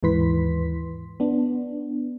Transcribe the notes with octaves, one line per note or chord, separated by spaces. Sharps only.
D#2 G#2 E3 B4 C6 B6
B3 D4